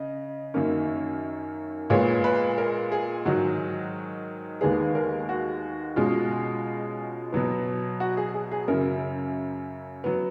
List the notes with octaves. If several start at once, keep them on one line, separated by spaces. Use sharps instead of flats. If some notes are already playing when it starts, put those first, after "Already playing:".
Already playing: C#3 D#5
F#2 D#3 A#3 C#4
A#2 G#3 B3 F4 C#5
B4
A#4
G#4
G#2 D#3 F#3 F#4
D#2 D#3 G#3 B3 G#4
A#4
F#4
B2 G#3 C#4 F4
B2 F#3 B3
F#4
G#4
G#4
G#4
F#2 C#3 F#3 A#4
F#3 B3